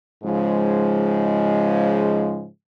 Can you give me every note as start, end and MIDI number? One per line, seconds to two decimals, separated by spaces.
0.24 2.48 44
0.24 2.48 49
0.24 2.48 53
0.24 2.48 56